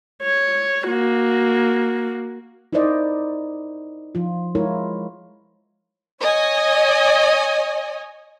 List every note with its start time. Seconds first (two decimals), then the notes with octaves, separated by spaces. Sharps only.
0.23 C#5
0.87 A#3 F#4
2.73 D#4 E4 A#4 C5 D5 D#5
4.15 F3 F4
4.55 G#3 E4 F4 A#4 C#5
6.21 C#5 D#5 G#5